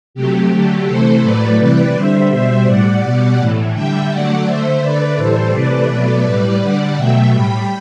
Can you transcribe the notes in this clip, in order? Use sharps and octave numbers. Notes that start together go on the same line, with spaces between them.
C3 F#3 A3 G4
D3 F#3 A3
C3 E3 A3 A4 C5
A2 F#3 A3 B4 D5
C3 E3 G3 B4 D5
D3 G3 C5 E5
B2 G3 C5 E5
A2 G3 D5 F#5
B2 G3
A2 E3 A3
D3 G3 E5 G5
D3 F#3 A3 D5 F#5
D3 A3 C5 E5
D3 A3 B4 D5
A2 E3 G3 A4 C5
C3 E3 A3 B4 D5
B2 F#3 A3
A2 G3
D3 G3 D5 F#5
B2 F#3 A3 E5 G5
A2 G3 G5 B5